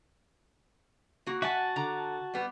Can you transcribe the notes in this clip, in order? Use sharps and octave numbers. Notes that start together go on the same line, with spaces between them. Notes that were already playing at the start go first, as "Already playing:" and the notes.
A#3 F#4
F#4 E5 F#5 G#5 A5
D3 A#5
G3 B3